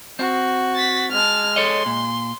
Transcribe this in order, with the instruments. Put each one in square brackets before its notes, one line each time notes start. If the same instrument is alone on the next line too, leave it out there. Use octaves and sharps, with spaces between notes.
[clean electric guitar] C4 [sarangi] F#4
[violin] A6 B6
[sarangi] G#3 [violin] A5 F6
[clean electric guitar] A4 C#5 D#5 [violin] C6
[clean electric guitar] A#2